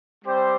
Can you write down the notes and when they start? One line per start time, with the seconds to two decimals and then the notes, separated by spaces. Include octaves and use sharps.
0.25 G3 C4 G4 C5